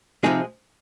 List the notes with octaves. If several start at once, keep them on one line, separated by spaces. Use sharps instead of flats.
C3 F3 G#3 C4 D#4 G#4